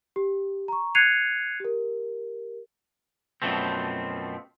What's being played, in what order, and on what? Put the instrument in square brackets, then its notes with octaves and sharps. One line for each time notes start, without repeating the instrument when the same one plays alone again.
[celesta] G4
A#5 C#6
F#6 G#6 C7 C#7 D#7 F7
G4 A#4
[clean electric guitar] F#2 B2 F3 A3 C4